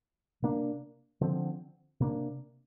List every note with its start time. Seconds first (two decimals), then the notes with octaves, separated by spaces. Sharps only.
0.42 C3 A#3 D4
1.21 D3 F3 C4
2.00 C3 A#3 D4